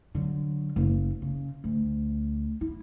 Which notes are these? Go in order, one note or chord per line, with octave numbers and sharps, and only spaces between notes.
D3 F#3
F#1
C#3
D2
E4